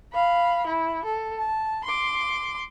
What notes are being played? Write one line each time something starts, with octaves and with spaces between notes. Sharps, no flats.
F5 B5
E4
A4
A5
C6 D6